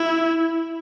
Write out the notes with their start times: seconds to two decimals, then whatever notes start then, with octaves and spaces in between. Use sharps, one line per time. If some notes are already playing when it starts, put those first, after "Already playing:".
Already playing: E4